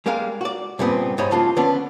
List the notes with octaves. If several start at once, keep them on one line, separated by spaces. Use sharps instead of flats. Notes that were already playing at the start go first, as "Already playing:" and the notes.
G3 G#3 A#3 A#4 F5
F#4 D5
G2 A#2 C#3 B3 C4
G#2 G3 C5 C#5 D#5 B5
C#3 F3 A#3 D4 F4 F#4
D3 F3 B3 C#4 D4